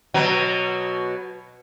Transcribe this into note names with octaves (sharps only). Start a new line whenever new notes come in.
B2 F#3